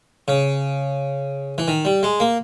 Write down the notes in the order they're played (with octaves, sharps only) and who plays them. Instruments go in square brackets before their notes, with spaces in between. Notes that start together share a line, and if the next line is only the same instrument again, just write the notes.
[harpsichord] C#3
E3
D#3
G3
G#3
A#3